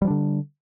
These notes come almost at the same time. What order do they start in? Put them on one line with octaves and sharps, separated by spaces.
G3 F3 D4 D3